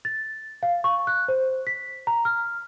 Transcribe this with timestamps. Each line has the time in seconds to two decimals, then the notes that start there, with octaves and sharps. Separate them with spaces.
0.05 A6
0.63 F5
0.84 C#6
1.07 F#6
1.28 C5
1.67 B6
2.07 A#5
2.25 F6